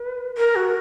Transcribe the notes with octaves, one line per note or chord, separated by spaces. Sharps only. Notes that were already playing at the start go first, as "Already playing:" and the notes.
Already playing: B4
A#4
F#4